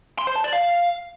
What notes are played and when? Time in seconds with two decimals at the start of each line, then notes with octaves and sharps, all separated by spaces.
0.18 C6
0.27 C5
0.36 A5
0.44 D5
0.53 F5